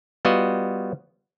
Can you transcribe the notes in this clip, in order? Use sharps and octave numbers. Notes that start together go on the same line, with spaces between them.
G3 B3 F4 F#4 D#5